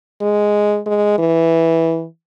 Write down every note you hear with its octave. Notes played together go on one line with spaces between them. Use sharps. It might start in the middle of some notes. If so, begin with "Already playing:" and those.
G#3
G#3
E3